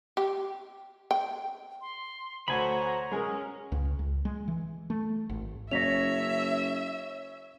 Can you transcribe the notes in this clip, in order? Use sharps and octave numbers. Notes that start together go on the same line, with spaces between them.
G4
G5
C6
D2 F#4 A4 C5 C#5 G#5 A#5 B5
G#3 C#4 G#4 A#4
C#2
C#2
G#3
E3
A3
G#1
F#1 C#4 C#5 E5 A#6 B6 F7